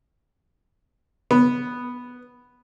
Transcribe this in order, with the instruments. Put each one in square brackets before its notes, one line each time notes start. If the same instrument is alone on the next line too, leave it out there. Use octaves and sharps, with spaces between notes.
[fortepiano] B3